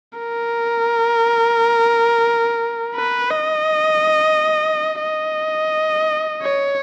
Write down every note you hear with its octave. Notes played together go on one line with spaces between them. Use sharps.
A#4
B4
D#5
D#5
C#5